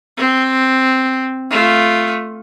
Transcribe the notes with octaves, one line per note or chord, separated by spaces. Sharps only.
C4
A3 F4